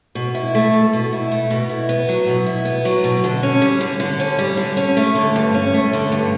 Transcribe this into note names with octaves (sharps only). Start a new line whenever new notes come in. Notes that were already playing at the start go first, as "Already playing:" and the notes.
B2
E4
A3
B2
B2
E4
A3
B2
E4
B3
F#3
B2
E4
B3
F#3
B2
D3
C#4
G3
D3
D3
C#4
G3
D3
C#4
A3
D3
G2
C#4
A3
D3
G2